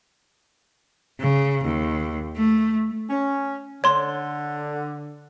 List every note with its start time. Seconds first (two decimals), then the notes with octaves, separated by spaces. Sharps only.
1.20 C#3
1.65 D#2
2.36 A3
3.09 C#4
3.84 D3 C#5 C6